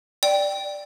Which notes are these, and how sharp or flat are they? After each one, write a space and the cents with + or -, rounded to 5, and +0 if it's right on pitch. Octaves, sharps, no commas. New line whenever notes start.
D5 +0 G5 +0